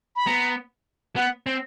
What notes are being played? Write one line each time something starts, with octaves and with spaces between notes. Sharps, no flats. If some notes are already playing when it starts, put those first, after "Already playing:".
B5
B3 A#5
B3 F#5
C4